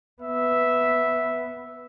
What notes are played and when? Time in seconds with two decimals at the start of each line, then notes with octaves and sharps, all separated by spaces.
0.22 B3 E5